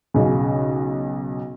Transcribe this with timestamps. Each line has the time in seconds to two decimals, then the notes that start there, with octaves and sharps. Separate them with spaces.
0.14 B1 C#3